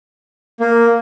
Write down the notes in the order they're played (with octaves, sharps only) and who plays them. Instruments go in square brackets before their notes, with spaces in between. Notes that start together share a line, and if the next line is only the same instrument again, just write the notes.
[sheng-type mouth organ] A#3